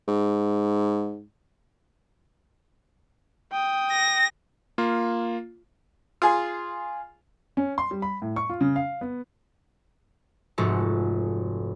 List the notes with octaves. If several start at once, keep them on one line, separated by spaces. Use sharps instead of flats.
G#2
G5 D#6
A#6
A#3 F4
F4 G#4 G#5
C#4
C6
G3
B5
A2
C#6
F4
C#3
F5
B3
F1 G#2 F#4 A4